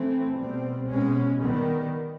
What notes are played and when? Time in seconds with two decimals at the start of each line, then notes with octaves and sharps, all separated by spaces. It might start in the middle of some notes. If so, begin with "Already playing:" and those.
Already playing: E3 A3 C4
0.36 B2 G3 C4
0.89 B2 G#3 C#4
1.42 D#3 G3 B3